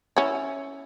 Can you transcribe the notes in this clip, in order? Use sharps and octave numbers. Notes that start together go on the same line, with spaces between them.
C#4 E4